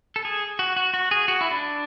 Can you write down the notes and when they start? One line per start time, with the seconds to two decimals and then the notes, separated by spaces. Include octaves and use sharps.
0.16 A4
0.25 G#4
0.59 F#4
0.76 F#4
0.94 F#4
1.11 G#4
1.28 F#4
1.41 E4
1.51 D4